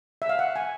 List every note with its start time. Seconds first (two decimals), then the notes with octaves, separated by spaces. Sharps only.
0.22 E5
0.29 F5
0.39 F#5
0.56 G#5